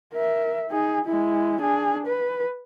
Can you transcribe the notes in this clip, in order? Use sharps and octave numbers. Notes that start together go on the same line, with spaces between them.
A#4 E5
D#4 G#4
G#3 E4
D4 G#4
B4